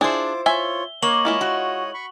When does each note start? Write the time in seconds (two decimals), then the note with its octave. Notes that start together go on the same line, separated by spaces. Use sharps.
0.01 D4 E4 F4 G#4 C5 D6
0.46 F4 C#5 E5 G#5 G7
1.03 A#3 C#5 D#5 C#6 F#7
1.25 G#3 E4 F4
1.41 F#4
1.94 B5 C#6